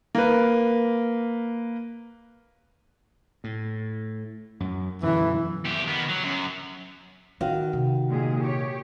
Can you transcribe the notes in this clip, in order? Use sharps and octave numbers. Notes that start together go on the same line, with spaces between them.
A#3 B4
A2
F#2
F#2 B2 D3 E3
E2 G4
D#3 B3
F#3
F#2
D#3 C4 F#4 F5
C3
A#2 G#3 G#4
G4 C#5